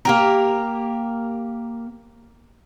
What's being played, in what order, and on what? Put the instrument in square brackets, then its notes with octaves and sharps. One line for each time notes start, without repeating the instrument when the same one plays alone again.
[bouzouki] A#3 G4 A#4